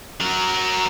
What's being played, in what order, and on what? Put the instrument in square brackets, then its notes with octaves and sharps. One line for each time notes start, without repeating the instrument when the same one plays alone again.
[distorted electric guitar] F#3 A#4